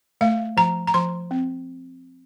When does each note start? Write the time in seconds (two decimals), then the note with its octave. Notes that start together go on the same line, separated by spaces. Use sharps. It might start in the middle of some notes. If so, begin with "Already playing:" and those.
0.21 A3 F5
0.57 F3 A#5
0.87 A#5
0.94 F3 C6
1.31 C4